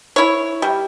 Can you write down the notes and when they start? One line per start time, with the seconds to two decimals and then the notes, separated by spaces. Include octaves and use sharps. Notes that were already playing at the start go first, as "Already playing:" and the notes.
0.16 E4 C#5
0.62 G3